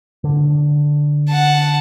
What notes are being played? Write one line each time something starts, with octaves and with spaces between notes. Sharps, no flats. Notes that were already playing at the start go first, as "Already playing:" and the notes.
D3
F#5 A5